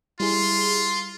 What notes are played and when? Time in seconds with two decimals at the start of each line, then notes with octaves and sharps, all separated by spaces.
0.20 G3 E4 F4 G#4 C6